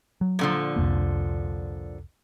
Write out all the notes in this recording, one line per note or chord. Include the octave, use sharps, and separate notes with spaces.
F#3
A#2 D3 F3
C2 F2 A#3